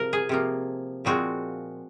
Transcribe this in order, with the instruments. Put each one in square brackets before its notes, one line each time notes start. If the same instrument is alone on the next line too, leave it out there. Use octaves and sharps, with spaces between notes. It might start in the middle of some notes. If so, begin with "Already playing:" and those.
Already playing: [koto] C3 F3 A#4
G#4
C3 F3 A#3
A#2 F3 G#3 C4 F#4